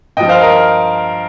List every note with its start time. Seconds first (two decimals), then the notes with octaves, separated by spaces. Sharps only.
0.17 G2 F3 D#5 G5
0.29 C5 F5
0.41 A#4 D#5